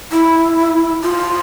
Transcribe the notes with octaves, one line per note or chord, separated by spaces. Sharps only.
E4
F4